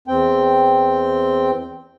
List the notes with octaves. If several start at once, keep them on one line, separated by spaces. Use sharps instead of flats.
E2 C4 G5